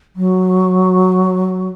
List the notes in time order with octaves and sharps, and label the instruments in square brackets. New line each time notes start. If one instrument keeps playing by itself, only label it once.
[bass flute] F#3